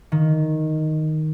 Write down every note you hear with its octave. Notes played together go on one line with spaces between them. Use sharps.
D#3